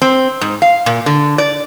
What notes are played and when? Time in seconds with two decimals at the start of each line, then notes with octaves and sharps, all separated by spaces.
0.02 C4
0.41 G#2
0.62 F5
0.86 A#2
1.06 D3
1.38 D5